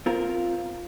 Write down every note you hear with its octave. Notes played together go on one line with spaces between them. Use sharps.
C4 F4 A#4